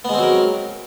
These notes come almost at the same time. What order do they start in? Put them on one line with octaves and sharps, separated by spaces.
B3 G#3 C4 F#3 A#4